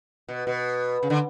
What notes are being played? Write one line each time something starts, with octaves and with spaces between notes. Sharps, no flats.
B2
B2
C#3
D3